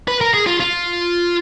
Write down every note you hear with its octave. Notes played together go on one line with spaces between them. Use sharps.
B4
A#4
G#4
F4
F4